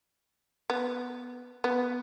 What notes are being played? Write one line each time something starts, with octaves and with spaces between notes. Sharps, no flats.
B3
B3